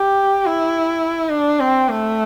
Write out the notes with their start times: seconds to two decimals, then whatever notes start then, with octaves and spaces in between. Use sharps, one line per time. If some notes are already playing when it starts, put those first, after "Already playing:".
Already playing: G4
0.46 E4
1.31 D4
1.60 C4
1.88 A3